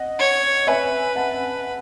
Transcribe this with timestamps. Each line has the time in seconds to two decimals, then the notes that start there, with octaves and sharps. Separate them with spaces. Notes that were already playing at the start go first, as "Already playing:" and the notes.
Already playing: D#5 F#5
0.19 C#5
0.67 B4 E5 G#5
1.16 F#5 A5